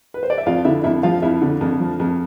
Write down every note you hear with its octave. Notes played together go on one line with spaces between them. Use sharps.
B4
C5
D5
E5
F2 F4 F5
D3 E4 E5
F2 E4 E5
F3 F4 F5
F2 E4 E5
D3
F2
F3
F2